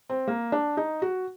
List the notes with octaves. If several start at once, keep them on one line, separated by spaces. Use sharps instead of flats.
C4
A#3
D4
D#4
F#4